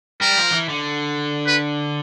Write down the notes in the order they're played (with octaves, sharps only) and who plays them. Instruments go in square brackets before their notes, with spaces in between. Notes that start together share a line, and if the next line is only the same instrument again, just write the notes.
[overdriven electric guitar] G3 [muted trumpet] A#4
[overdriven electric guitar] F3
E3
D3
[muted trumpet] B4